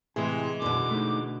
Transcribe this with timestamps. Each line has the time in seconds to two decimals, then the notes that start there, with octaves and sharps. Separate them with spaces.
0.16 A2 C3 E3 G#3 G#4
0.62 B1 F#2 B2 D3 D6
0.91 A3 D#4